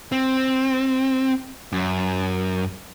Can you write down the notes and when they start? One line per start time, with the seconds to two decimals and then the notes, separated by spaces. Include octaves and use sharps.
0.12 C4
1.72 F#2